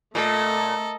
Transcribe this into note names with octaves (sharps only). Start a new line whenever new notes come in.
A#2 A3 A4 D#5